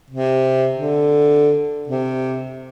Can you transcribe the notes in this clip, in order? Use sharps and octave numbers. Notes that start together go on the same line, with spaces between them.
C3
D3
C3